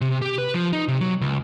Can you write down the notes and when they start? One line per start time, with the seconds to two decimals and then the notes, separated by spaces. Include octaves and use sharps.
0.01 C3
0.22 G4
0.38 B4
0.54 F3
0.73 D#4
0.88 C3
1.01 F#3
1.21 C#2